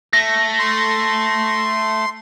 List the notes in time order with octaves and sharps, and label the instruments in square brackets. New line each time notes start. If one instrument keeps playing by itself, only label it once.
[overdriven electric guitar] A3 [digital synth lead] A#6
[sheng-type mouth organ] C6